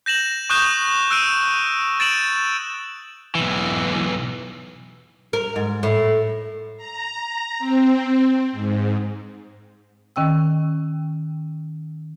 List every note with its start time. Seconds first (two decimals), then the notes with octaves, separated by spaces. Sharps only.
0.06 G6 A#6 E7 F#7
0.50 C#6 D#6 F#6 G6 E7
1.11 E6 F#6 D7 D#7
2.00 A6 D7 E7 F#7
3.35 B1 E3
5.33 A#4
5.56 G#2
5.83 A2
6.77 A#5
7.59 C4
8.52 G#2
10.16 D#3 C#4 G5 E6